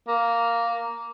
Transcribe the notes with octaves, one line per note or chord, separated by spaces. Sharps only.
A#3